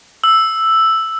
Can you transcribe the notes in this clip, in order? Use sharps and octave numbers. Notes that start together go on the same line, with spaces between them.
E6